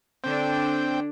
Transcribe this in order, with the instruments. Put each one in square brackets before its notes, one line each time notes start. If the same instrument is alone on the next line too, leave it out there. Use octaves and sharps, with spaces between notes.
[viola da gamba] D3 D4 [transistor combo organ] C4 G5